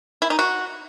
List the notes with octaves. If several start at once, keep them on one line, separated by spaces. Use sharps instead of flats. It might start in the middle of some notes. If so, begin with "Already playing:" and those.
E4
D#4
F#4